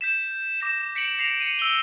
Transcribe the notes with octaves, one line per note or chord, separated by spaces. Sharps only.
G6 B6 E7
D6 A#6 E7
B6 C#7 D7 F#7
A#6 C7 F7
C#7 D#7
E6 G7